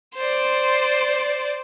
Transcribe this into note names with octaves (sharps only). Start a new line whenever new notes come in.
C5 D5